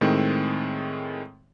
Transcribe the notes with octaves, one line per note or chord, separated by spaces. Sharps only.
A2 D#3 G#3 C4